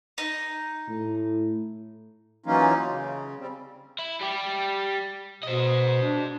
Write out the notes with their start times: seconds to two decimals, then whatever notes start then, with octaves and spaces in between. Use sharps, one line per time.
0.18 D#4
0.89 A2
2.46 E3 F#3 A#3 C#4 D#4 F4
2.90 C#3
3.39 G3 C4
3.99 E4
4.21 G3 G4
5.43 B2 C5 D#5
6.03 D4